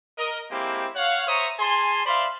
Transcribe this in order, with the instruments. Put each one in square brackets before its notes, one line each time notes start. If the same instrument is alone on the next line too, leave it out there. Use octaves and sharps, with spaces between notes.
[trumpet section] A#4 D#5
G#3 A#3 C4 E4 G4
C#5 F5 F#5
C5 C#5 E5 A#5 C#6 D#6
G#4 G#5 A5 C6
C5 D5 E5 F5 B5 C6